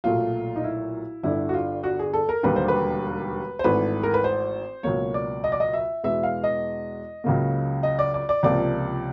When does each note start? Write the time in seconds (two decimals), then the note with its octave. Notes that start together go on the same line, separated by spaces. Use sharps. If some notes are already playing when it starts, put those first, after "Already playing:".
0.04 B1 A#2 F#3 A3 F4
0.56 D#4
0.64 E4
1.23 G1 G2 D3 E4
1.49 F#4
1.54 F4
1.84 F#4
1.99 G#4
2.13 A4
2.29 A#4
2.43 E1 D#2 D3 G3 A#3 B4
2.56 C5
2.68 B4
3.59 C5
3.64 G#1 G#2 E3 A3 B4
4.03 A#4
4.14 B4
4.24 C5
4.83 C#2 B2 F#3 A#3 C#5
5.14 D5
5.44 D#5
5.52 D5
5.60 D#5
5.73 E5
6.03 E2 B2 G#3 B3 E5
6.23 F5
6.44 D#5
7.24 C#2 C#3 F#3 A#3
7.83 D#5
7.99 D5
8.14 D5
8.29 D5
8.43 C#2 C3 F3 A#3 D5